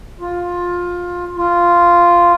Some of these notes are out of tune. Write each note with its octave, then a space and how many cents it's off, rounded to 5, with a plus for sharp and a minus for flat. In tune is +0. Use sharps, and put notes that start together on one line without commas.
F4 +15
F4 -5